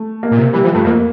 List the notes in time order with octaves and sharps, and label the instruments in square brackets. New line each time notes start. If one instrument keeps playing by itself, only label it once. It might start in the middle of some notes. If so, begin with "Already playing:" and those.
Already playing: [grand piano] A3
A#3
[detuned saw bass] A#2
C3
[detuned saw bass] E3 [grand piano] G3
[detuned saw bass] E3 [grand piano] F3
[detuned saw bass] G2 [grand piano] A3
[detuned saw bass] F2 [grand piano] A#3